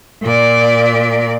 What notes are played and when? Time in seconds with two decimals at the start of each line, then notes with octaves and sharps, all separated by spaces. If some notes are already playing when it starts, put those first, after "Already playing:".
0.22 A#2 D5